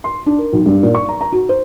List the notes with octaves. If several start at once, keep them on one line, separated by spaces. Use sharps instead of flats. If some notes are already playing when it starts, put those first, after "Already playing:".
C6
D4
A#4
B1
G2
A#2
C#6
A#5
A#5
F#4
C5